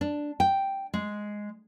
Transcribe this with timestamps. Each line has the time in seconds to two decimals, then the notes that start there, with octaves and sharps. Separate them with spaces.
0.01 D4
0.40 G5
0.94 G#3